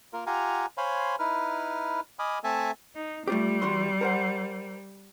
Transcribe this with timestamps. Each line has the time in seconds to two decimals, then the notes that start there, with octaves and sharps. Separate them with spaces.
0.13 A#3 F4 A#4
0.26 F4 G4 F5 F#5 G#5 A#5
0.78 C5 C#5 F5 G#5 B5 C6
1.19 D#4 E4 B4 F6
2.19 D#5 G#5 B5 D6 D#6 F6
2.44 A3 C4 A4 E5 G#5 A5
2.96 D#4
3.28 G3 A3 F4 G4
3.62 E2 F#4 C6
4.01 A#4 C5 F#5